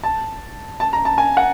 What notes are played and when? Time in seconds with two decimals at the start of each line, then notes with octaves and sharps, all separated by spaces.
0.03 A5
0.80 A5
0.93 A#5
1.05 A5
1.18 G#5
1.37 F#5